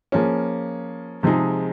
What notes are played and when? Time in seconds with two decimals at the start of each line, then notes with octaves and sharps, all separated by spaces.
0.12 F3 A#3 C#4 G#4
1.23 C3 F3 G#3 D#4 G#4